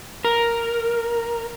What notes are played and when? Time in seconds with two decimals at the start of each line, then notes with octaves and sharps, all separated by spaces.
0.25 A#4